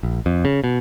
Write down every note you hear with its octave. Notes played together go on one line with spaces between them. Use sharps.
A#1
F2
C#3
B2